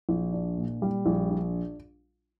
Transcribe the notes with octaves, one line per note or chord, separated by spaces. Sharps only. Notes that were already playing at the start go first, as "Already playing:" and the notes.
A#1
D4
A#2
G3
A#1
D4